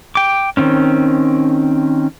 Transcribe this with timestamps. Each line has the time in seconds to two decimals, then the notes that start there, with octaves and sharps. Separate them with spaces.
0.15 G5 D6
0.57 D#3 C4 C#4